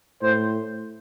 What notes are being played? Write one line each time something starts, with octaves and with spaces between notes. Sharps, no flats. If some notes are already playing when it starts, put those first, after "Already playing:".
A2 C5